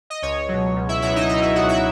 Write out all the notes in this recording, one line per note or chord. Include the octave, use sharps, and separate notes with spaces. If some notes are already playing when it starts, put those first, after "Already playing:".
D#5
C#2 C#5
B2 F#3
C#2
E4 E5
B2 F#3 E4 E5
D#4 D#5
C#2 D#4 D#5
E4 E5
B2 F#3 F#4 F#5
E4 E5